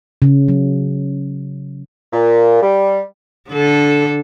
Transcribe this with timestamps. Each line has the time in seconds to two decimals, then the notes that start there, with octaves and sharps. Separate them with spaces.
0.22 C#3
0.48 F#3
2.12 A#2
2.61 G3
3.49 D3 A4